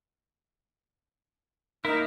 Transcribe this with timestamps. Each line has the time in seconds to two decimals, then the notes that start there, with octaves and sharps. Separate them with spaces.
1.85 A#3 D#4 E4 A#4